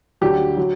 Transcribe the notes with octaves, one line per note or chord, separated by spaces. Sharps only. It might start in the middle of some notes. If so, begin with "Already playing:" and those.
D2 D3 F#3 G4
F#3